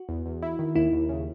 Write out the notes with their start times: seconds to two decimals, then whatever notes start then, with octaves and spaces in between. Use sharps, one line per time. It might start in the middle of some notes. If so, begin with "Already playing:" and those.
Already playing: F#4
0.09 E2
0.26 E2
0.43 E4
0.59 D#3
0.76 D#2 E4
0.92 D#2
1.09 C#3